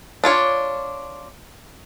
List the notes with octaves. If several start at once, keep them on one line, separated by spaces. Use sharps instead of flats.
D4 F4 C#5